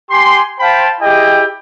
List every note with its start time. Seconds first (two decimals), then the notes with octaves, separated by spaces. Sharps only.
0.10 G4 G#5 C6
0.60 C5 F5 G5 A5 B5
1.02 E4 G4 G#4 D#5 G5